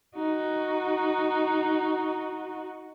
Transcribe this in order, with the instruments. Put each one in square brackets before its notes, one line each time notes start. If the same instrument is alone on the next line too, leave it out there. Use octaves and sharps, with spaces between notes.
[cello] D#4 F#4